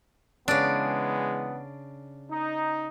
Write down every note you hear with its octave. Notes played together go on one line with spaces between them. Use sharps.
C#3 E3 G#3 B3 D4
D#4